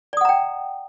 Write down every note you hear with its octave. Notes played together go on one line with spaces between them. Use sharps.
D5 F#5 G5 A#5 D#6